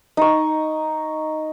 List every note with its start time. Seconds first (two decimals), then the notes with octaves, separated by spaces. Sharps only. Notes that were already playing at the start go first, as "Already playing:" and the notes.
0.17 D#4 C#6